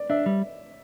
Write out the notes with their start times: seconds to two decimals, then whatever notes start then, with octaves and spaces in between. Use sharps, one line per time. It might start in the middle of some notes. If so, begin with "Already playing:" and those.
Already playing: D5
0.10 D4 E5
0.26 G3